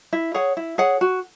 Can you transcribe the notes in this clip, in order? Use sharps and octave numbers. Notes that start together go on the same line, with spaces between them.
E4
G#4 C#5 F#5
E4
G#4 C#5 F#5
F#4